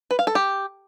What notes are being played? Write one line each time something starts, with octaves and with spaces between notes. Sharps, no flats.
B4
F5
A4
G4